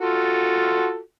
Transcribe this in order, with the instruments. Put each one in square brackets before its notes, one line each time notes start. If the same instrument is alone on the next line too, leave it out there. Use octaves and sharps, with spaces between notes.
[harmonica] F4 F#4 A4